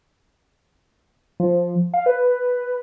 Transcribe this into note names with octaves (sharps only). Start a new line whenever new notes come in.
F3
F5
B4